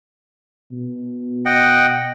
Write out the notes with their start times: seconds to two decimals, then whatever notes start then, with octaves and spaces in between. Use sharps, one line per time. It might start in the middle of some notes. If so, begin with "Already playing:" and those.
0.72 B2
1.46 D#5 F#5 G5